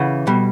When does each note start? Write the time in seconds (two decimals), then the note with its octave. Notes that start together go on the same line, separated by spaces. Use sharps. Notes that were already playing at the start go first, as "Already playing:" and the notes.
Already playing: C#3 E3 F#5
0.27 B2 G3